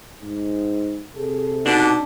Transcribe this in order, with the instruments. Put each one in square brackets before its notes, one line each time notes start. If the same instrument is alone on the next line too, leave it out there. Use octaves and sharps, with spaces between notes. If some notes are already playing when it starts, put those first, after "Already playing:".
[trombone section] G#2
[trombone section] C3 A4 [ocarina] G#4
[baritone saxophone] B2 [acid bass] D4 [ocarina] D#4